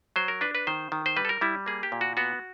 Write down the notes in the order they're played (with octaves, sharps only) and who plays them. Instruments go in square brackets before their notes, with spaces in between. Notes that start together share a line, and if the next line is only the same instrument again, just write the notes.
[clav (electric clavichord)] F#3 C5
A#4
D4 B4
B4
D#3 C5
D#3
C5
G3 B4
A4
A#4
G3 E4
A#3 G#4
G4
A#2
F#4
B3 F#4